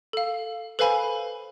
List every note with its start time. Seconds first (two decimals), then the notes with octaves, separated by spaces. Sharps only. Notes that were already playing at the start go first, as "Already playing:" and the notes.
0.13 A4 F5
0.79 A4 B4 C5 F5 G#5 B5